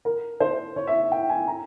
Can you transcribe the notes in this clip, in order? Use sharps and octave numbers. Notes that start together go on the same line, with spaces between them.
A#4
C5
C#5
E5
G5
G#5
A#5